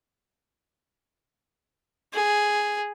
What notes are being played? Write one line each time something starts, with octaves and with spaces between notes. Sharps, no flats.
G#4